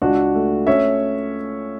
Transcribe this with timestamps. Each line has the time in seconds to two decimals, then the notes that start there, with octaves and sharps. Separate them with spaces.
0.02 C#2 D4 F#4
0.35 A3
0.67 C#4 C#5 E5